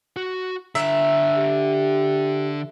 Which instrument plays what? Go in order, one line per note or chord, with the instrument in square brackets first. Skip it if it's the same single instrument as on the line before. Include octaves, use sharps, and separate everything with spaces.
[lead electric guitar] F#4
[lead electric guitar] D3 A#5 [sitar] E5
[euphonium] G4